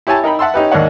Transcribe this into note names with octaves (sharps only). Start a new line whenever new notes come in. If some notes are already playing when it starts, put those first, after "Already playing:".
E4 G4 C#5 G#5 A5
D#4 A#4 G5 B5
E5 F#5 A5 C6 E6
C#4 D#4 G4 B4
D#2 G#2 A#3 D4 C#5 F#5